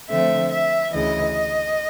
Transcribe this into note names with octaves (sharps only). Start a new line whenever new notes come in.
D3 F3 A3 C4 E5
E5
D2 C#3 E3 D#5